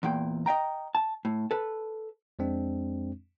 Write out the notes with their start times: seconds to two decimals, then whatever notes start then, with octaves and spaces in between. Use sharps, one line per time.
0.03 E2 A#2 G5
0.46 D#5 E5 G5 A#5
0.95 A5
1.25 A2
1.51 A4 B4
2.39 F2 G#3 C4 D4